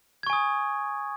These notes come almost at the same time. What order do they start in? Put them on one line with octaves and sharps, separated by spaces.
G#6 C#6 G#5 D#6